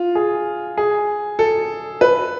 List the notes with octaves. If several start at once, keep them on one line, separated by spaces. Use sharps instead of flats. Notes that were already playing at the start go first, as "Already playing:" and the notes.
Already playing: F4
G#4
G#4
A4
B4